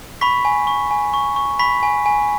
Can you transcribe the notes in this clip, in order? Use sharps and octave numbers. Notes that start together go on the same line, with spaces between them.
B5 C#6 B6
G#5
C#6
G#5
C#6
C#6
B5 C#6 B6
G#5
G#5